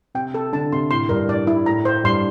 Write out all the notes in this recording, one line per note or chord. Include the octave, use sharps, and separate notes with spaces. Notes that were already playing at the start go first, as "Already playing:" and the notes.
C3 G5
A4
D3 A5
C3 C6
A2 C6
G2 A#4
A2 D5
E4
A2 A#5
C5
G2 C6